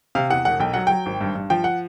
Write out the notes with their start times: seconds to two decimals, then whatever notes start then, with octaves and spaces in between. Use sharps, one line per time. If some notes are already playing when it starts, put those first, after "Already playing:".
0.15 C3 F5
0.30 E2 F#5
0.45 E1 F#5
0.60 B1 G5
0.74 F#3 F#5
0.87 F#3 G5
1.06 G#1
1.21 G2
1.35 G2
1.50 F3 G5
1.64 F#5